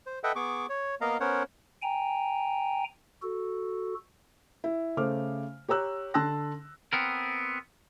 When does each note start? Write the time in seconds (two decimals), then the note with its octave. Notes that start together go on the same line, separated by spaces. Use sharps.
0.06 C5
0.24 A4 B4 D#5 E5 F#5 G5
0.36 B3 G#4 C#6 D6
0.69 C#5
1.01 A#3 B3 A#4 D#5 F5 A#5
1.20 B3 C#4 A#4 C5 C#5 F#5
1.82 G5 G#5 A#5
3.22 F#4 A4
4.64 E4
4.97 C#3 A3 C5 D6 F6
5.68 G4 C#5 A#5 E6 F#6
6.14 D3 A5 C6 E6 F#6 A#6
6.93 B3 C4 A#4